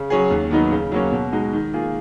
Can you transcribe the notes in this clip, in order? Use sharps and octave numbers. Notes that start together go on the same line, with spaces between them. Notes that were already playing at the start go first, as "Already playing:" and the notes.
Already playing: C#3
F#3 C#4 G#4
D#2
D#3 F#3 B3 D#4
C#3
F#3 A#3 C#4
B2
G#3 D#4 F#4
D#3
A#3 F4 G#4